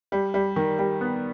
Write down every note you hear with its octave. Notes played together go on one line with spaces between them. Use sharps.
G3
G3
D#3
G3
B3